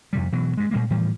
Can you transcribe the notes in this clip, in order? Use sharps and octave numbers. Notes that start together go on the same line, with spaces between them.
F2 C3 G3
B2 E3 F#3
G2 G#3
A#2 G3 G#3 A#3
A2 E3 F3 G3